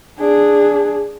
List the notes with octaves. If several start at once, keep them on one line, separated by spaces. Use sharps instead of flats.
D4 G#4